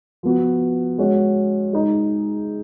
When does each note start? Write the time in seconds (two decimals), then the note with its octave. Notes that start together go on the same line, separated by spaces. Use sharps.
0.23 F3 B3 F#4
0.98 G#3 C#4 F#4
1.73 G#3 D#4 G#4